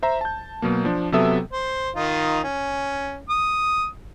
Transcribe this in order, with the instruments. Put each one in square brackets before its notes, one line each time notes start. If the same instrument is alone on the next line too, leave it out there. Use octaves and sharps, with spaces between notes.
[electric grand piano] C5 E5 A#5
A5 G6
B2 F#3 A#3
F3 D4
C3 F#3 B3 A4 E5 D#6
[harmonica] C5
D#3 D#4 F4
C#4
D#6